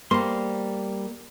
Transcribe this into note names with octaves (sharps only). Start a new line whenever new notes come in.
G3 A#3 C5 C6